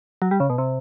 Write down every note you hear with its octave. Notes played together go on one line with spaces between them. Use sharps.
F#3
G3
C#3
B2
C3